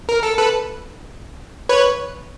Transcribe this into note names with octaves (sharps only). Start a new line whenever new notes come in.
A#4
A4
A4 B4
B4 C#5